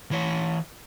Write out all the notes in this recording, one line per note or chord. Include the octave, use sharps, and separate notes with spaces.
E3 C#5